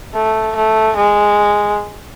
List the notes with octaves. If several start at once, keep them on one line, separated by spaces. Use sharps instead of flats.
A3
A3
G#3